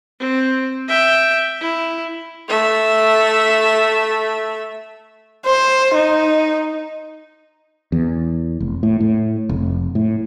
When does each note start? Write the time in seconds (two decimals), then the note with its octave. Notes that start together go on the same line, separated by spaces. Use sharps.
0.20 C4
0.87 E5 G5
1.61 E4
2.48 A3 E5
5.46 C5
5.95 D#4
7.92 E2
8.60 F1
8.83 A2
9.00 A2
9.49 F1
9.95 A2